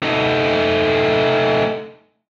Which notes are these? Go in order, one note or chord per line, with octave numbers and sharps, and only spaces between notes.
A3 D#4